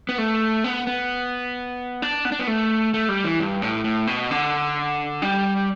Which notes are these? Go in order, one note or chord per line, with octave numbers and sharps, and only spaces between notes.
B3
A3
B3
B3
D4
B3
D4
B3
A3
A3
G3
E3
G2
A2
A2
B2
D3
G3